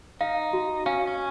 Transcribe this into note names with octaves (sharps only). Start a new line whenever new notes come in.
D#4 F5
F#4
C#4 F5
C#4